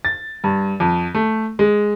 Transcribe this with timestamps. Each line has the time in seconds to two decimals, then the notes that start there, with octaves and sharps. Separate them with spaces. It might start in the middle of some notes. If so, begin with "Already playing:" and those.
0.05 A6
0.44 G2
0.80 F2
1.14 A3
1.59 G#3